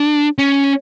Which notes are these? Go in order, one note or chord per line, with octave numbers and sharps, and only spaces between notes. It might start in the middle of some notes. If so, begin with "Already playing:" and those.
Already playing: D4
C#4